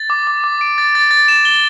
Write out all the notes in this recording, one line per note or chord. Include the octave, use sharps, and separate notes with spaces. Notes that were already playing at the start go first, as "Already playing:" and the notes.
Already playing: A6
D6
D6
D6
D7
A6
A6
A6
E7
G7